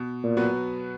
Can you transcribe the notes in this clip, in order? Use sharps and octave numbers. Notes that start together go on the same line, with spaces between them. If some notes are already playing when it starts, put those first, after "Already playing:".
Already playing: B2
A#2
F#3 B3 F#4 B4